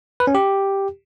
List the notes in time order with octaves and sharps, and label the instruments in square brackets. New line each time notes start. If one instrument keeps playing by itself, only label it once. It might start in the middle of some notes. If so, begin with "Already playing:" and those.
[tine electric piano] B4
C#4
G4